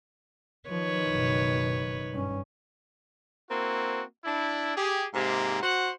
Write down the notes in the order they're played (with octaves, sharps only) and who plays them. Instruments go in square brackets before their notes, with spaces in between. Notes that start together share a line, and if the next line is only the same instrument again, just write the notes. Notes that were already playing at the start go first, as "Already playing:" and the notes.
[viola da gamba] D#3 B4 C#5 [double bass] F3
[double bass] F#1 B2
G2 C#4
[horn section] A#3 C4 E4 F#4
D4 E4
G4 G#4
G#2 C3 G#3 A#3
F#4 C5 F#5